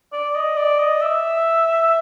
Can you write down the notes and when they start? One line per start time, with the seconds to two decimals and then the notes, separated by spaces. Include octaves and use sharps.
0.13 D5
0.35 D#5
0.57 D5
0.79 D#5
1.01 E5